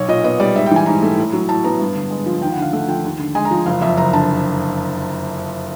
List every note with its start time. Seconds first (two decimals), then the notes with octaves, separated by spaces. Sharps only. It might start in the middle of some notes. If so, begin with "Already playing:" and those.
Already playing: B1 C#5
0.08 A#2 D#5
0.24 B3 D#5
0.40 G3 D5
0.55 G#2 E5
0.66 G5
0.71 E3 G#5
0.86 G#2 A#5
1.02 A3
1.17 A2
1.33 F#3
1.49 A2 A5
1.64 B3 A#5
1.80 G2
1.95 D3
2.11 G#3
2.26 F3
2.42 D#2 G5
2.52 F#5
2.57 D3 F5
2.73 A3 F#5
2.88 F3 G5
3.04 D#2
3.19 D3
3.35 G#3 G#5
3.45 A#5
3.51 F3
3.66 F#1 F5
3.82 F2 E5
3.97 F#1 A#5
4.13 D3 A5